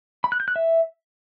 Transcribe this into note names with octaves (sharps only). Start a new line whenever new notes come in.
B5
F#6
G6
F#6
E5